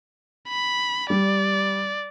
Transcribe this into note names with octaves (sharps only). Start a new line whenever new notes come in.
B5
G3 D5